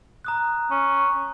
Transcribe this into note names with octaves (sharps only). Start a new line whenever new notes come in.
A#5 D#6 F#6
C#4